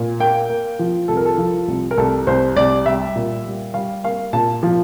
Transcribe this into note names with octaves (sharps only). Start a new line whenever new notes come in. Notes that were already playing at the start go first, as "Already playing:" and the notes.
Already playing: A#2
A#3 G5
A#3
F3
C2 A4
A#4
A4
F3
C2
A#4
C2 A4
C2 C5
C2 D5
G3 E5
A#2
G3
G3 F5
A#3 F5
A#2 A5
F3